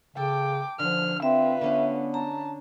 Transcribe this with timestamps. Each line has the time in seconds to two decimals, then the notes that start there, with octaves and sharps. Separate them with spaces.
0.17 C#3 A4 G5 D6
0.79 D3 F3 F6
1.22 C4 F4 B4 E5
1.61 D3 B3 C#4 D4
2.14 A5 A#5